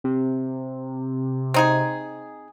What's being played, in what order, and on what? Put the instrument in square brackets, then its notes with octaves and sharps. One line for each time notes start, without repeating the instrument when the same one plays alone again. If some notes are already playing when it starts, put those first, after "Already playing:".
[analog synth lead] C3
[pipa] C4 D#4 G#4